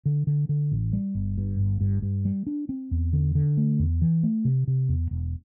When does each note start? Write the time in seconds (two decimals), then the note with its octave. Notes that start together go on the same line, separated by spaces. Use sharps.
0.06 D3
0.27 D3
0.49 D3
0.72 A1
0.93 G3
1.15 G1
1.38 G2
1.59 G1
1.81 G2
2.02 G2
2.25 G3
2.47 D4
2.69 C4
2.91 E2
3.13 D3
3.35 D3
3.57 A3
3.79 E2
4.02 E3
4.23 A3
4.45 C3
4.67 C3
4.89 E2
5.11 E1